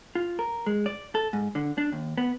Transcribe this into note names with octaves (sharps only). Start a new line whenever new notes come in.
F4
A#4
G#3
D5
A4
G#2
D3
D4
D#2
B3